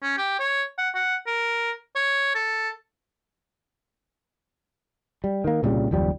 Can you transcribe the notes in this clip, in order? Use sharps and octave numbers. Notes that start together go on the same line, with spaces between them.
C#4
G4
C#5
F#5
F#5
A#4
C#5
A4
G3
D#3 A#3
C2 A#2 C#3 G3
F#1 D#2 F3 G3